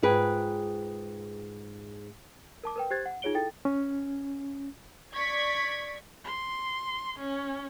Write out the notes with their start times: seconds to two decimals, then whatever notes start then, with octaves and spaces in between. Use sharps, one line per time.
0.03 G#2 F4 G#4 B4 G5
2.64 A#4 A5 D6
2.76 A#4 B4 G5
2.90 G4 C5 F#6 G#6 A6
3.06 F#5
3.22 D#4 F4 G#4 C#5 D7 G7
3.34 E4 A4 G5 A6
3.65 C#4
5.14 D5 C#6 G#6 B6
6.24 C6
7.20 C#4